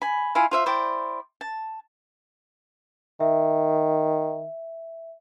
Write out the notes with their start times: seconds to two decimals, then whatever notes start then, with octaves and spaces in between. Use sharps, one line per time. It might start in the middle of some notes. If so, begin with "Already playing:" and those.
0.02 G#5 B5
0.35 E4 F4 F5 G#5
0.51 F4 C5 E5
0.66 E4 C5 D5 G5
1.41 A5
3.20 D#3 E5